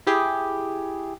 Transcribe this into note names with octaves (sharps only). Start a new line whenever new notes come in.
E4 G4 G#4